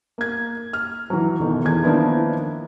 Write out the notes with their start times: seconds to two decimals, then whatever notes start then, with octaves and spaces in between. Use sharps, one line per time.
0.18 A#3 G#6
0.73 F6
1.10 E3 F#3
1.40 F1 B2 D#3
1.65 E2 G#6
1.83 D#3 F3 A#3 B3 D4 E4